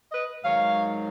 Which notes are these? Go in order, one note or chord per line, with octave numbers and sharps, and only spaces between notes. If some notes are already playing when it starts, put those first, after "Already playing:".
B4 D#5
G#2 D#3 F#3 C#5 F5